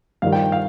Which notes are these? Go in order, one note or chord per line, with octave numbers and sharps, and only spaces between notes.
G2 D#3 G3 F5
G5
F5